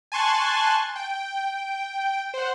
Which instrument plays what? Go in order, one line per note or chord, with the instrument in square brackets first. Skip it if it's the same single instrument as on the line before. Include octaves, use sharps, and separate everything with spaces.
[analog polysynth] G#5 A5 C6 C#6 F#6 A6
G5
C5 F#5